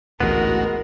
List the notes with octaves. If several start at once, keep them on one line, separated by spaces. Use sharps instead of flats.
A1 D2 G#2 G#3 B3 F#4 A#4